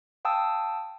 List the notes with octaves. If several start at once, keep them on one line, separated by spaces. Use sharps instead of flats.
F5 G5 A5 D#6 E6